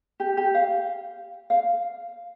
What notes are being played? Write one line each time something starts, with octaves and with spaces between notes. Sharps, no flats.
G4
G4
F5
F5